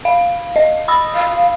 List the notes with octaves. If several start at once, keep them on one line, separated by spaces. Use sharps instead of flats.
F5
D#5
B5 D#6 E6
F5